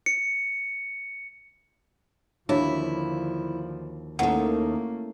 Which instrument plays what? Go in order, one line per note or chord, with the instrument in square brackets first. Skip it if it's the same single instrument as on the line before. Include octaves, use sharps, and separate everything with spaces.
[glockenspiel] C#7
[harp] D#2 F#4 B5 [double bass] D3 F3 [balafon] D4 C#5 [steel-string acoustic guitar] E4
[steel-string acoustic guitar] D#2 D#3 [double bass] A3 A#3 [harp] C#4 E4 A4 [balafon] F#5